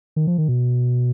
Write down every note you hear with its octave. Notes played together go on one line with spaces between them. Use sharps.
D#3
F3
D#3
B2